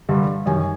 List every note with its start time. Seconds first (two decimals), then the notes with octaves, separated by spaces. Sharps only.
0.09 G2 D3 G3
0.46 F#2 D#3 G3 G#5